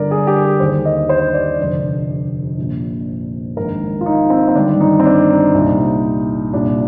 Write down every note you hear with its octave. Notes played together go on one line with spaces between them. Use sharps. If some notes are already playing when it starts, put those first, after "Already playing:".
Already playing: G1 G2 D3 A#4 D5
G#4
G4
G#4
D#2 D3 C5
D#5
C5
D5
F1 F2 D3
A#1 A#2
A#1 G#2 D#3 A#4
F4
D#4
C4
C4
G1 G2 D#3 D4
D#4
C4
D4
D#4
C2 A#2
C2 A#2 D4